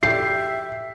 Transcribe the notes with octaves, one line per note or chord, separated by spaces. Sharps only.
G4 E5 C7